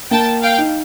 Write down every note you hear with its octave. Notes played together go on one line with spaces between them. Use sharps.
A#3 G5 A5
F5 G5
D#4